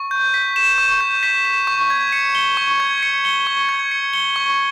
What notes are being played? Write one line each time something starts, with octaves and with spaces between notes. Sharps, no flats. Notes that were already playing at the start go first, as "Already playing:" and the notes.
Already playing: C#6
G6
B6
E7
C#6
G6
B6
E7
C#6
G#6
C#7
G7
C#6
G#6
C#7
G7
C#6
G#6
C#7
G7
C#6